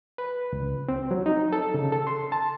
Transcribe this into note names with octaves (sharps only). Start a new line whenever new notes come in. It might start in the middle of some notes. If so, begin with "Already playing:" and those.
B4
C#2
C4
F#3
D#4
A4
C#3
A4
C6
A5